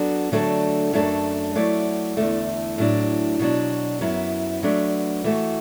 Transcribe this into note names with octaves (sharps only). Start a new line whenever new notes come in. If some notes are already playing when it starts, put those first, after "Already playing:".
Already playing: F#3 B3 D4 F#4 A4
D3 F#3 A3 D4 A4
F#2 F#3 A3 D4 A4
F#3 A3 E4 D5
E2 D3 A3
A2 F#3 D4
B2 F#3 D4
F#2 F#3 B3 E4
F#3 A3 D4 B4
E3 A3 F#4